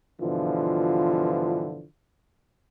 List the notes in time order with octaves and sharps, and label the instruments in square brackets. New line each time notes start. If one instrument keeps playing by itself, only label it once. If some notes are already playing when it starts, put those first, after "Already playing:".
[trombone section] G2 B2 D3 E3 F3 F4